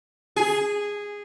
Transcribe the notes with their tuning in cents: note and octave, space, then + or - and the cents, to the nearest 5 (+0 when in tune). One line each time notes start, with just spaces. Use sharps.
G#4 -10